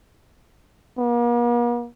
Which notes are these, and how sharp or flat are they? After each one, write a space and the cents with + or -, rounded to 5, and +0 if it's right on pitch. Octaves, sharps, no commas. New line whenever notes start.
A#3 +45